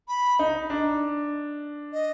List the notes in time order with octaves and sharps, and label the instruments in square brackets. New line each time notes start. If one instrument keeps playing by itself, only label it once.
[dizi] B5
[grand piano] D#4
D4
[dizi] D#5